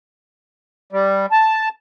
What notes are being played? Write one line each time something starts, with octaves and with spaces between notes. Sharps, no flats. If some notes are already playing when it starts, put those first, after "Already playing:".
G3
A5